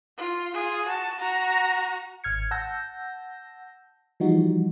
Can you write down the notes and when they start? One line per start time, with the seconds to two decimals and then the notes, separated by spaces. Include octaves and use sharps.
0.17 F4
0.53 F4 G#4
0.85 F#4 A5
1.19 F#4 A#5
2.24 G#1 F6 G#6 C#7
2.51 F#5 A5 E6 G6 A#6
4.20 E3 F3 G3 D#4 F#4